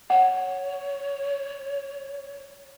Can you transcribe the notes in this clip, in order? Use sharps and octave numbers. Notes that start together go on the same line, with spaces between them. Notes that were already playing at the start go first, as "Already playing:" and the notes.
C#5 F#5